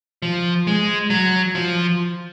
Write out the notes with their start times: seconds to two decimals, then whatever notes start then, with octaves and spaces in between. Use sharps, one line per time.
0.22 F3
0.67 G#3
1.10 F#3
1.55 F3